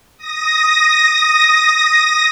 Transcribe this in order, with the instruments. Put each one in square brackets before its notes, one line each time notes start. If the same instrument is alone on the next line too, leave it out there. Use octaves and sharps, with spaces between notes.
[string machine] D#6 A#6